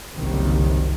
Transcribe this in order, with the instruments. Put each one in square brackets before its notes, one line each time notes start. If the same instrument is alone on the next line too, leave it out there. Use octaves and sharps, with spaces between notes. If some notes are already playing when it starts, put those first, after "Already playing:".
[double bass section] F#1 C2 C3 D#3